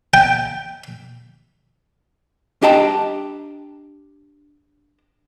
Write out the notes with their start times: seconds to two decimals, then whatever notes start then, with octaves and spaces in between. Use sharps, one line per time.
0.14 G5
2.62 D4 G4 D#5 G5 A5 A#5